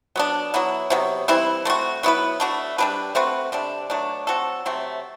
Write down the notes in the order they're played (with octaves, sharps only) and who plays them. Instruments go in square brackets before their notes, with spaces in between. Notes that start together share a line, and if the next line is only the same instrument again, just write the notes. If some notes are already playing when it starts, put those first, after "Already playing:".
[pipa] F#3 B3 D4
F#3 B3 E4
C3 F#3 B3
E3 G3 C4 E4
A3 C4 F#4
F#3 B3 E4 B4
A3 D4 F#4
G3 D4 G4 B4
A3 C4 F#4 B4
C3 G3 D4
B2 F#3 A3 D4
F#3 C4 F#4 A4
C3 F#3 A3 C4